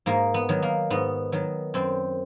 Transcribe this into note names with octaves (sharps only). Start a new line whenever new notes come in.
G#2 A#3
B3
D#3 F#3
A#3
G#2 B3
D#3 F#3
F#2 C4